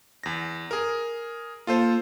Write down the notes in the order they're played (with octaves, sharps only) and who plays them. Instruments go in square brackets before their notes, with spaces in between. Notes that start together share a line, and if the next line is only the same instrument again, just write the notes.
[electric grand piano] E2 A#6
G#4 A#4
[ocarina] A#3 [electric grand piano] F4 A4 C5